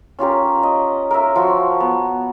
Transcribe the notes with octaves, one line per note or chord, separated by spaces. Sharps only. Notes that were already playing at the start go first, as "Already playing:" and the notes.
C#4 F4 G4 A#4
D#5
A#4 E5
F3 F#4 C6
B3